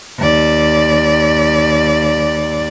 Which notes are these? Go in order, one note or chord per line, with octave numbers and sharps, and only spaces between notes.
D#2 D5